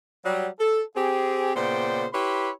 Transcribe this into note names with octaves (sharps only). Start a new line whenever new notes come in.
F#3 G3
A4
C4 G4 G#4
A#2 C#3 B3 C5 D5 G5
E4 G4 B4 C#5 B5 C6